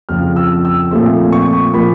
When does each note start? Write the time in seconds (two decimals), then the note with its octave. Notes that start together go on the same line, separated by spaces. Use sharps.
0.09 F2 C#3 F3 F6
0.36 E6
0.65 E6
0.91 A#2 F3 A3 C4
1.32 C#6
1.74 A#2 F3 A#3 B5